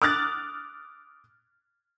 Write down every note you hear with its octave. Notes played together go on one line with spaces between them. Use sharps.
D6 D#6 F6 F#6 A6